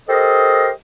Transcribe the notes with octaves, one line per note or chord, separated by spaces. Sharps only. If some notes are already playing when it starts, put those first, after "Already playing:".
G4 A4 A#4 C5 D#5